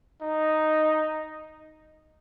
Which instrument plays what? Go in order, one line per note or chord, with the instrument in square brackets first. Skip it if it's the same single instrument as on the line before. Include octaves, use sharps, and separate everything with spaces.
[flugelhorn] D#4